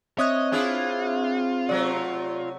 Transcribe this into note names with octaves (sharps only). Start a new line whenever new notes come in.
C4 C#5 D#5 E5 D#6 F#6
D4 E4 F4 G#4
C3 F#3 A3 D5